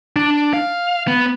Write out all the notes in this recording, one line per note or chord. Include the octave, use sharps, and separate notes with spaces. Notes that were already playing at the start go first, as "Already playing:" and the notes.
D4
F5
B3